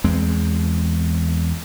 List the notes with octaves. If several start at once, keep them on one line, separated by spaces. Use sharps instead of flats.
E2 G#3 C4